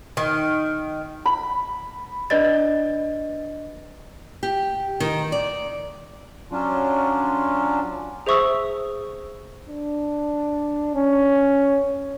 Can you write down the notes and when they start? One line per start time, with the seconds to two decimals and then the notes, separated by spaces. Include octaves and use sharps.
0.17 D#3
1.26 B5
2.30 D4 B4 D5 D#5 A6
4.43 G4
5.00 D#3
5.32 D5
6.51 F#3 C#4 D4 F4
8.26 G#4 C5 E5 C#6 D#6 E6
9.69 D4
10.95 C#4